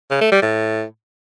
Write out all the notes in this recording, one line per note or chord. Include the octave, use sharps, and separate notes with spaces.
C#3
A3
G3
A2